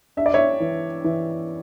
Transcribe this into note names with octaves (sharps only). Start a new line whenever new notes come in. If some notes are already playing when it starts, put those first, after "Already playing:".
D4 E5
D5
C#5 E5
E3
E3